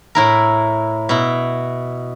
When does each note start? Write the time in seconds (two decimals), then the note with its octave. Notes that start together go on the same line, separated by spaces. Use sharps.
0.15 A2 E4 A#4
1.09 B2 E4